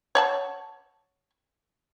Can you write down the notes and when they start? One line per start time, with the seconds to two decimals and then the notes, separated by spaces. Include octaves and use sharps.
0.15 C#5 F#5 A5